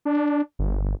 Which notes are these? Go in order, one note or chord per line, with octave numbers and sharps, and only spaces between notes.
D4
G1